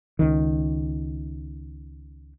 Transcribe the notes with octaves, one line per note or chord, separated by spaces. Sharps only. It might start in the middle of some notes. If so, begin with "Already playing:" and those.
C#2 D#3